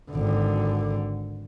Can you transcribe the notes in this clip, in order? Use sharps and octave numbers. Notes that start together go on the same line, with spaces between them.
G#1 D3